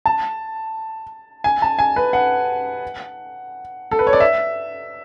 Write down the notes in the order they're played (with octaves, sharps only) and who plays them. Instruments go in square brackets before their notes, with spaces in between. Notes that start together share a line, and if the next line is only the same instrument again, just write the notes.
[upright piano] A5
G#5
A5
G#5
B4
F#5
A4
B4
C#5
D5
E5